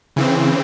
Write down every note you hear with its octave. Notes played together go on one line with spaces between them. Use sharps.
C#3 E3 C4